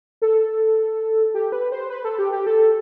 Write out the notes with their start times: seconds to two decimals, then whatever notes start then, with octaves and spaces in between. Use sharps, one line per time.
0.22 A4
1.34 G4
1.52 B4
1.72 C5
1.90 B4
2.05 A4
2.18 G4
2.32 G4
2.47 A4